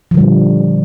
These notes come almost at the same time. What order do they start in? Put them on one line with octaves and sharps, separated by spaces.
F3 D3 G3 A#2